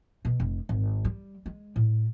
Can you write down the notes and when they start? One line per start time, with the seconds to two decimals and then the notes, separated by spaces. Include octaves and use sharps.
0.25 B2
0.40 F1
0.69 G#1
1.05 G3
1.46 G#3
1.76 A2